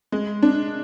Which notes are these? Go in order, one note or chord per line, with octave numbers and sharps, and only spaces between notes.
G#3
D4